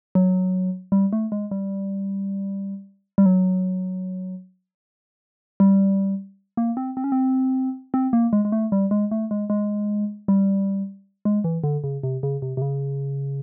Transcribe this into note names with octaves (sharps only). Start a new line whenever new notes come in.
F#3
G3
A3
G#3
G3
G3
F#3
G3
A#3
C4
C4
C#4
C4
C4
A#3
G#3
G#3
A3
G3
G#3
A3
G#3
G#3
G3
G#3
E3
D3
C#3
C3
C#3
C3
C3
C#3